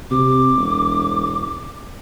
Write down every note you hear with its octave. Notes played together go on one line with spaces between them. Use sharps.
C3 D6
E1